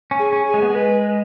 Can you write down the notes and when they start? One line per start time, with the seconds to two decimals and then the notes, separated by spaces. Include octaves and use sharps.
0.11 C#4
0.19 G#4
0.33 C#4
0.47 G#4
0.54 G#3
0.62 B3
0.70 G#3 B4